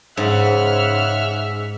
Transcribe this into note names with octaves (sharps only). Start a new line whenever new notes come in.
G#2 C#3 E5 F#5 F6